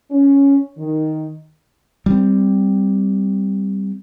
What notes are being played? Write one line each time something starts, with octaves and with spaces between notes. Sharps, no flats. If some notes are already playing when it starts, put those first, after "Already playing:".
C#4
D#3
G3 C4